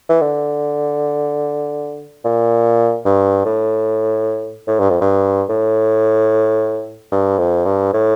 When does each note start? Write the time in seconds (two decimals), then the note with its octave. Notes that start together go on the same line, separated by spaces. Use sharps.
0.09 E3
0.21 D3
2.25 A#2
3.05 G2
3.45 A2
4.67 A2
4.79 G2
4.90 F2
5.01 G2
5.49 A2
7.12 G2
7.38 F2
7.65 G2
7.93 A2